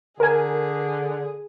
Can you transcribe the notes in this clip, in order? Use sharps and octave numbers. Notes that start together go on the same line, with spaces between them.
D3 G#4 A#4 G#5